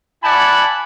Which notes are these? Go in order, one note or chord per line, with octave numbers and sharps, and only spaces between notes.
E4 D5 F#5 G#5 A5 B5